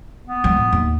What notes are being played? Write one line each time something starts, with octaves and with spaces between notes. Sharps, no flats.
B3
F3 G#3
A2
D#2